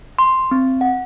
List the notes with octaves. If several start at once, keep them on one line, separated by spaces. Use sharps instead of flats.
C6
C4
F#5